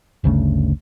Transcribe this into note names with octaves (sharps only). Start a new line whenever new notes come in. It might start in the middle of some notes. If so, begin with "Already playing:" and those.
G1 D2 C#3 A3